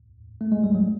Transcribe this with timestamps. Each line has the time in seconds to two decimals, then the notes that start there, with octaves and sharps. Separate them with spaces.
0.41 A3
0.52 G#3
0.64 G3
0.75 F#3